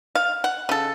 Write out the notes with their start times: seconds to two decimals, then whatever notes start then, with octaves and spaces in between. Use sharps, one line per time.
0.15 F5
0.44 F#5
0.69 C#3 A4